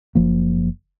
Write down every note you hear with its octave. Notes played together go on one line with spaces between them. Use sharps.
F#1 F3 A#3